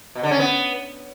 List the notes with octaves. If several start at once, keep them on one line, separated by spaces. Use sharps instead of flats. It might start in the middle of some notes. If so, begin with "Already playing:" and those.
B2
D3
C#4
B3